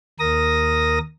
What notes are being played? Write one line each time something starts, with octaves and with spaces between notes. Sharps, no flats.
D#2 A#4 D#6 A#6